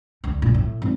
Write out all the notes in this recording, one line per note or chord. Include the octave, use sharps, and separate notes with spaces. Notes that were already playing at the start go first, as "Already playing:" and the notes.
D2
A#2
A2
G#1